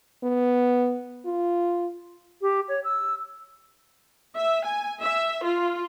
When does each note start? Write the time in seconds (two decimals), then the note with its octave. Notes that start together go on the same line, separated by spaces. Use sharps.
0.24 B3
1.25 F4
2.41 G4
2.68 C#5
2.84 E6
4.37 E5
4.66 G#5
5.02 E5
5.43 F4